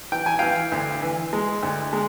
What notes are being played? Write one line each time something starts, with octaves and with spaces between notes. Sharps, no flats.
E3 G5
G#5
E3 F5 G5
D2
E3
G#3
D2
G#3